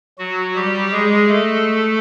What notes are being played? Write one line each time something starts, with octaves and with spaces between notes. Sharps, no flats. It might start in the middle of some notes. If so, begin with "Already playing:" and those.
F#3 F#4
G3 G4
G#3 G#4
A3 A4